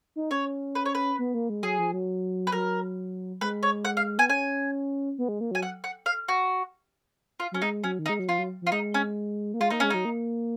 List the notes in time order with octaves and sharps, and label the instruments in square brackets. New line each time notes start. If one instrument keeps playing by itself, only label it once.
[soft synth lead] D#4
[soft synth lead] C#4 [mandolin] C#5
[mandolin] B4
C#5
B4
[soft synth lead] B3
A#3
G#3
[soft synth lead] F#3 [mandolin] G#4
[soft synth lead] F3
F#3
[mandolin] B4
[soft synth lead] F#3 [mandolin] A#4
[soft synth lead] G#3 [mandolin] B4
[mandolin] C#5
F#5
F5
[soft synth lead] B3 [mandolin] G#5
[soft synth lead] C#4 [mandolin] G#5
[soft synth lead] B3
G#3
A#3
[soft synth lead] F#3 [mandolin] G#5
[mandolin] F#5
F#5
F5
F#4
F4
[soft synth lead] F#3 [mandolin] C#4
[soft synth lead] G#3 [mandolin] D#4
[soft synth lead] F#3 [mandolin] C#4
[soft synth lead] D#3
[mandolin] D#4
[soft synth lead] G#3
F#3
[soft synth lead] F3 [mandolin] F4
[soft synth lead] F#3
[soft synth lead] F3 [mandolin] F4
[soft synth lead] G#3 [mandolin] D#4
[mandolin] C#4
[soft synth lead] A#3
[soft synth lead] G#3 [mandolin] F4
[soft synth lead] A#3 [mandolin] D#4
[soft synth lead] G#3 [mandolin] C#4
[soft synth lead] F#3 [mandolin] D#4
[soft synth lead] A#3